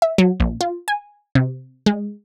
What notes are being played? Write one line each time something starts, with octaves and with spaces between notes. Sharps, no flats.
E5
F#3
A#1
F4
G#5
C3
G#3